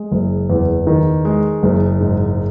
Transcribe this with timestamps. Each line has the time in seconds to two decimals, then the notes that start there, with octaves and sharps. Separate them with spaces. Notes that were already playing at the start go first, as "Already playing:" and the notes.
Already playing: G#3
0.11 F#1
0.50 E2
0.87 D#3
1.25 G#3
1.63 F#1
2.00 G#2